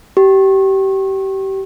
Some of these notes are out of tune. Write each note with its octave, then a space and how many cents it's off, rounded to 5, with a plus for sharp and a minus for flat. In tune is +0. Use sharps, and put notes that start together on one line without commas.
G4 -25